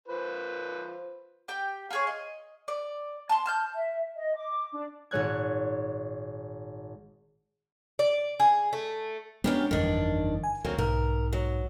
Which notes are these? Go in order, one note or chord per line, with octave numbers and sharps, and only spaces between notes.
F4 B4 C5
G4 G5
F4 G#4 C#5
D#5
D5
A5 C6
A5 F6 G6
E5
D#5
D6
D4
G#1 A#2 G#3 C#5 F#6 G#6
D5
G#4
A3
F#2 G#3 B3 C#4 D4 G4 B4 F6
G1 F2 D#3 E3 D4
G#5
D2 F#3 A#3 C4
B1 G#2 A#4
F#3